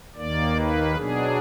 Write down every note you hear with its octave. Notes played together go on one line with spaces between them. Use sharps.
D#2 D#3 A#3 D5
B4
B2 F#3 D4 G#4